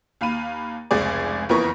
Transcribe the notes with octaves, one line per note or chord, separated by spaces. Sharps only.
D#2 F5 B5 D#7
F1 C#2 G#4 D5
F#1 F2 E3 B3 A#4 C#6